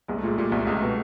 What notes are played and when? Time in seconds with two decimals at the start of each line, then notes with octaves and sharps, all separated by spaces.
0.08 C2 G#3
0.18 A3
0.23 A#2 G#3
0.38 A#2 G3
0.52 C2 A3
0.67 C#2
0.81 B2